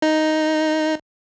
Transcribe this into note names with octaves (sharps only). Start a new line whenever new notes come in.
D#4